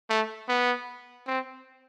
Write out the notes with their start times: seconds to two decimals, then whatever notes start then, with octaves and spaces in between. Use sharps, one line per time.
0.10 A3
0.48 B3
1.27 C4